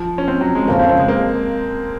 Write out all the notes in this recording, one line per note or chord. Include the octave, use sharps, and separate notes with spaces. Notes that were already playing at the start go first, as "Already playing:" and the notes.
Already playing: F3
C#4
C4
F#3
G#3
F2 C#3 F3 A#3
C4
C4
G#3
A#3